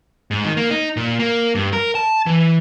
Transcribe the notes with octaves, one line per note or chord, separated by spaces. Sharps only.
G#2
D#3
A#3
D#4
A#2
A#3
G2
A#4
A5
E3